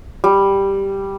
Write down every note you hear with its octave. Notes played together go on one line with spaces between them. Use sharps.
G3